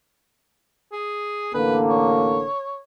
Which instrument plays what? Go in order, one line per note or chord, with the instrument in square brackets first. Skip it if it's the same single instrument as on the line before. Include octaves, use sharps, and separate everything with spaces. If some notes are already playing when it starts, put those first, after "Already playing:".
[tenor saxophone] G#4
[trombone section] A1 D3 A#3 [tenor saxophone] B4
[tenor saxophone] C#5